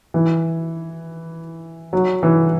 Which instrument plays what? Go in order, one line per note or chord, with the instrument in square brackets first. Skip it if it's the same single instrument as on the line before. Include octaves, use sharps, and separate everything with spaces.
[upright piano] E3
F#3
E3